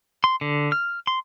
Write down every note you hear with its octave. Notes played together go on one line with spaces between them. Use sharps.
C6
D3
F6
C6